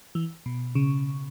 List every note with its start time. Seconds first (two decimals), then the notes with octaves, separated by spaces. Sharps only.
0.15 E3
0.46 B2
0.75 C#3